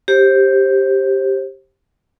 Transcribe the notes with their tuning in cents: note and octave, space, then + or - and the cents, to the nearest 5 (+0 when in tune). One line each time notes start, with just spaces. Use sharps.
G4 +0 C5 +25